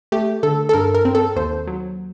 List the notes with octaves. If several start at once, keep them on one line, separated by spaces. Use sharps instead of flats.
A3 G4
D3 A4
A4
G2 A#4
A#4
C4
A4
D#2 C5
F#3